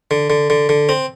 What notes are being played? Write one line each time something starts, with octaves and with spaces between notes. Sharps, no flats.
D3
D3
D3
D3
C4